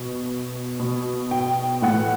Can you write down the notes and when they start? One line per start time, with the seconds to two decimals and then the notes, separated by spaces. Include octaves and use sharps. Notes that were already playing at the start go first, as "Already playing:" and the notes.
Already playing: B2
0.80 B2
1.31 G5
1.82 A2 E3 F#5